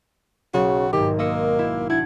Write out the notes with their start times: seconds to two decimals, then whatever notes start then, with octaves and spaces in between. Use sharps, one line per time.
0.54 B1 C#3 F#4
0.93 G#1 G#2 D#3 G4
1.19 A#3 D#5 E6 C#7
1.59 E4
1.89 D4 E4 F#5 G#6